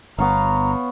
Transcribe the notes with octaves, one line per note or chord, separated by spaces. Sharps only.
G1 B3 C#5 F5 A#5